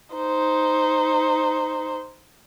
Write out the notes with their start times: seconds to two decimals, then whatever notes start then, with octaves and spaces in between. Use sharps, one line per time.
0.15 D#4 C5